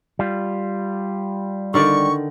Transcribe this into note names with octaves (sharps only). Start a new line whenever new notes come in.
G3 F4
D3 D#3 D5 C#6